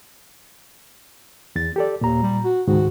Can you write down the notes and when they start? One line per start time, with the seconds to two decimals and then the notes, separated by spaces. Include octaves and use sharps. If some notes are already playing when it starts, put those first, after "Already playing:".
1.56 E2 A6
1.76 G4 A4 D5
2.01 D#2 A#2 A#5
2.22 G3
2.44 F#4
2.67 C#2 G#2 D#3 F#4